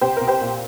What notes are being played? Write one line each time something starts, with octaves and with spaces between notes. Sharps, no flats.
C2 G4 C5
C2 A#4
G4 C5
A#2